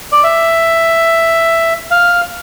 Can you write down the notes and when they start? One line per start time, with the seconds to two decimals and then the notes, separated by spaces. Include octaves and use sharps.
0.12 D5
0.24 E5
1.91 F5